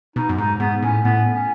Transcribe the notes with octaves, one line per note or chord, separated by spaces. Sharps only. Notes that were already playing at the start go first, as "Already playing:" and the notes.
B2 D#4
F#2
G#2 D#4
G#2 B3
A2 C#4
A2 B3
C#4